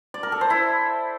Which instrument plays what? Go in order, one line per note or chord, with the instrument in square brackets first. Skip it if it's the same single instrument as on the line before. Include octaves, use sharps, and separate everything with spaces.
[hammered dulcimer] D5
A#4
A4
C5
E4